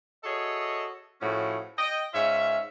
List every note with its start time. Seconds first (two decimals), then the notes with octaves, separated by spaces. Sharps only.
0.24 F#4 G#4 A4 C#5 D#5 E5
1.21 A2 F3 C#4 F#4 G#4
1.78 D#5 G5
2.13 G#2 C#4 F4 C#5 E5